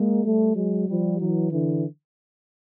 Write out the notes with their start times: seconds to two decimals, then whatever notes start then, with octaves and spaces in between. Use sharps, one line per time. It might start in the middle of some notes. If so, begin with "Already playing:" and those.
Already playing: G#3 A#3
0.24 G3 A3
0.55 F#3 G#3
0.88 F3 G3
1.19 E3 F#3
1.51 D3 E3